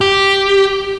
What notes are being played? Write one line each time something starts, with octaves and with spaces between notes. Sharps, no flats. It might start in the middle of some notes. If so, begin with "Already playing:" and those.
G4